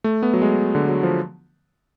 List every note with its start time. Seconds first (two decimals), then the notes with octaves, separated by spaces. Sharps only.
0.04 A3
0.23 B3
0.34 F#3
0.42 G#3
0.75 D3
0.89 F#3
1.03 F3